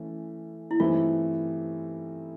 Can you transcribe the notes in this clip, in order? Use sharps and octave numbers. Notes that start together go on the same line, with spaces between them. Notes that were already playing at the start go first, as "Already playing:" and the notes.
Already playing: E3 A3 C#4 E4
E4
G2 E3 A3 C4 D#4 F4